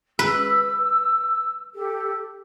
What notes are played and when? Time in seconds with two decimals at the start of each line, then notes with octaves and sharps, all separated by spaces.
0.19 B4 E6
1.74 G4 A4